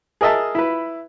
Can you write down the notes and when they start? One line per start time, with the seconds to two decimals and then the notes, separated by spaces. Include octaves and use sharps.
0.21 G#4 A#4 D#5 E5 A5
0.55 E4 B4